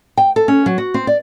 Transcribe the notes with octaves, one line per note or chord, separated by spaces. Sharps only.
G5
A4
C#4
F#3
F#4
C4
D5